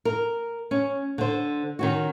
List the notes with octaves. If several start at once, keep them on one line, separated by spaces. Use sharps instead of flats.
A#4
C#4
D3 C5
D#3 C#4 F#4